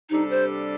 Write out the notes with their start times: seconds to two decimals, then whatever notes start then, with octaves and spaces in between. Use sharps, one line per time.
0.10 C3 G3 D4 D#4 A4
0.31 C5